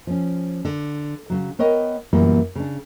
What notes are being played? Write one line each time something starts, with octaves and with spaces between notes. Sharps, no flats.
F3 C#4
D3
C#3 F#3
B3 A#4 C#5 D#5 G5
F#2 A#2 E3 G3 A#3 B3
C#3 D4